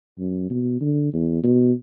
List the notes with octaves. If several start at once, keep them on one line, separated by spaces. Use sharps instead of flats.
F#2
B2
D3
E2
B2